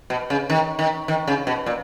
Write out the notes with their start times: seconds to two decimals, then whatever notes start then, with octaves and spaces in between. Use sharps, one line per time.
0.10 B2
0.30 C#3
0.50 D#3
0.79 D#3
1.08 D#3
1.27 C#3
1.47 B2
1.66 A#2